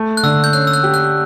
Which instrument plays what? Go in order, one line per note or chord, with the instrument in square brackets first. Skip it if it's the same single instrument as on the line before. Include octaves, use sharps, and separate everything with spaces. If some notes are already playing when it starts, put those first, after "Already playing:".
Already playing: [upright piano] A3
[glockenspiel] F#6
[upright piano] D3 [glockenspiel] E6
[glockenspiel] G6
[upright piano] C#4 [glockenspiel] F#6
[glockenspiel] E6
F#6
[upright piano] G4
[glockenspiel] F#6